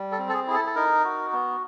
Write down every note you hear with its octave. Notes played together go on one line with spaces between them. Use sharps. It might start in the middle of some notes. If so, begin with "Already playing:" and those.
Already playing: G3
A4
C4
A4
G#4
E4 G#4
A4
A4
D#4 A#4
F#4
B3